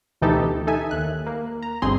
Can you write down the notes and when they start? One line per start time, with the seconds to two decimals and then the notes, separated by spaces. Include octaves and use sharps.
0.21 D2 B2 E3 D#4 G4 A4
0.67 D#4 A4 E5 G#5
0.91 D#2 F#6
1.26 A#3
1.62 A#5
1.82 G1 G2 B2 C4 G#4 C6